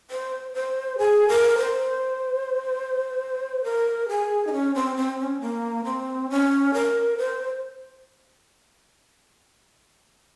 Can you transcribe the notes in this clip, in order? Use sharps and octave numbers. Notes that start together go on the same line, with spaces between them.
C5
C5
G#4
A#4
C5
A#4
G#4
D#4
C#4
C4
C4
C#4
A#3
C4
C#4
A#4
C5